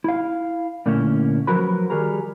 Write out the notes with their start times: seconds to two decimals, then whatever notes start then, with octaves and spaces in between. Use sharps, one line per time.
0.04 E4 F5
0.86 A#2 D3 A3 A#3 C#4 E4
1.47 F3 F#3 F#4 A#4 B4 B5
1.90 D#3 G3 F#4 G#4 A#4 A#5